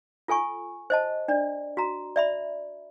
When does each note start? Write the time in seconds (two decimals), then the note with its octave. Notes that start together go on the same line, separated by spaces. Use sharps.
0.28 F4 A4 G#5 C#6
0.90 C5 D#5 A5
1.28 D4 D5
1.77 F#4 A#5
2.16 D5 E5 B5